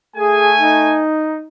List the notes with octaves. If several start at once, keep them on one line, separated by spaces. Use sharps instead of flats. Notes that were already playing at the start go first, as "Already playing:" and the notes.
A3 G#4 G#5
D#4